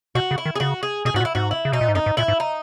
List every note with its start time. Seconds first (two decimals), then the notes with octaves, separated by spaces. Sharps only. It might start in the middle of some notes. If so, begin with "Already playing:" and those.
0.15 B2 F#4
0.31 C#3
0.38 E4
0.46 D#3
0.56 G#4
0.60 C#3 F#4
0.83 G#4
1.05 B2 G#4
1.14 G#2 F#4
1.21 A#2
1.25 E4
1.35 G#2 F#4
1.51 E4
1.65 C#3
1.72 B2 D#4
1.81 A#2
1.88 G#2
1.95 F#2 D#4
2.06 G#2
2.17 A#2 E4
2.28 G#2
2.40 D#4